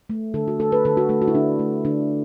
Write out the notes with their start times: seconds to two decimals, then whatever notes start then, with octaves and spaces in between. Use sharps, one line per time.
0.10 A3
0.34 D3 A4
0.48 F#4
0.59 A3 A4
0.72 B4
0.85 D3 A4
0.97 F#4
1.09 A3 A4
1.22 F#4
1.28 E4
1.34 D3 D4
1.59 A3
1.85 D3 D4